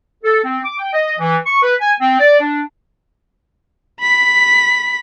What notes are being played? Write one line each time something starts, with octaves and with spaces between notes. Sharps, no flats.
A4
C4
D6
G5
D#5
E3
C#6
B4
G#5
C4
D5
D4
B5 B6